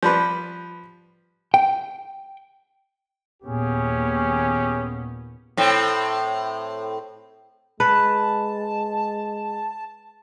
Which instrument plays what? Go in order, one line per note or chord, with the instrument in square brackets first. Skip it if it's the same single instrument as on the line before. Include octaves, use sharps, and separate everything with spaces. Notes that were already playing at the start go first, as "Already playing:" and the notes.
[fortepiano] F3 G3 B4
[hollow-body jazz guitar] G5
[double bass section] D#2 A#2 B3 [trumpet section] C#4 G4 G#4
[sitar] A2 C4
[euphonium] G#3 [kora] B4 [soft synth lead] A5